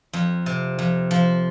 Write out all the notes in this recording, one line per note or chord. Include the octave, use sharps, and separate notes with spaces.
F2
C3
F2
F3